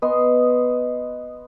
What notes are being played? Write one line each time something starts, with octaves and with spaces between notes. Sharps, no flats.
B3 D#5 C6